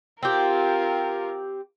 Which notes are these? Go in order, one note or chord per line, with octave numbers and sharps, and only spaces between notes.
C4 F4 G4 A#4